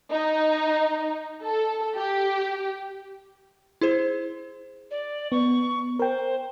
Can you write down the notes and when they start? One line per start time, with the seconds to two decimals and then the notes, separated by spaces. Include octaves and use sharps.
0.12 D#4
1.43 A4
1.96 G4
3.81 E4 G#4 C5
4.91 D5
5.32 B3 C#6
5.99 A#4 C5 G5